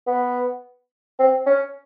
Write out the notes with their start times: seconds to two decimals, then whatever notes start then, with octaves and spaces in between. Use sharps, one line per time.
0.07 B3
1.19 C4
1.47 C#4